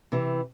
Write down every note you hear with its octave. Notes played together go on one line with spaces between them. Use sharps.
C3 E3